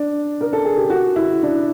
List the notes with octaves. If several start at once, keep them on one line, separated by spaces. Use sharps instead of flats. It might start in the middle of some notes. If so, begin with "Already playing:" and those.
Already playing: D4
A#4
A4
G#4
G4
F#4
E4
D4